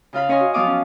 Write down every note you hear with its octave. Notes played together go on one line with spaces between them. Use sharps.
C#3 F4 F5 B5
C#4 C#5 D#5 G#5 C6
F#4
F3 F#3 B3 F5 D6 D#6
C#4